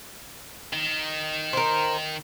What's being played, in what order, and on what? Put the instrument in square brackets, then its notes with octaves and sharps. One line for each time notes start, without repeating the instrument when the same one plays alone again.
[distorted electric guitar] D#3
[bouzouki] A#4 C5